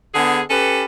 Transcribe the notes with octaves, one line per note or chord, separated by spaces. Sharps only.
D3 B3 G#4
C#4 G4 A4 B4